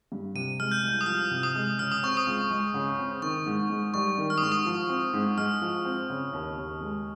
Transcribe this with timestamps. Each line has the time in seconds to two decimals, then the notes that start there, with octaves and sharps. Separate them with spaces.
0.12 G2
0.35 C3 D#7
0.59 G#3 F6
0.72 G6
0.83 C2
1.01 D#6
1.06 F3 F6
1.31 C3
1.43 D#6
1.55 G#3
1.79 C#3 F6
1.91 D#6
2.03 C4 C#6
2.17 D#6
2.27 C#2
2.50 G#3
2.74 C#3
2.98 C4
3.22 D#3 C#6
3.46 G#2
3.69 G#2
3.94 G3 C#6
4.18 D#3
4.30 F6
4.38 D#6
4.42 G#2 C#6
4.52 D#6
4.66 F3
4.89 C4
5.13 G#2
5.37 G#3 F6
5.62 F3
5.85 C4
6.10 C#3
6.33 D#2
6.58 D#2
6.81 G#3